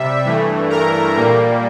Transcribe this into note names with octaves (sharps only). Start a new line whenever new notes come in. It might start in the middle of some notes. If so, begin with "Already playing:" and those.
Already playing: C3 G3 E5
G2 E3 A3
A#4 A#5
A#2 G3 A#3